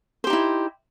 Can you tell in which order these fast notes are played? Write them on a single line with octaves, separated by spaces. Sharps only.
C5 G4 D#4 E4